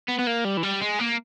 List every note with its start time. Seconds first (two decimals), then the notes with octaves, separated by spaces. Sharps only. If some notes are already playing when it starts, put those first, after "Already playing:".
0.08 B3
0.19 B3
0.27 A#3
0.44 G3
0.57 E3
0.63 G3
0.82 G#3
1.00 A#3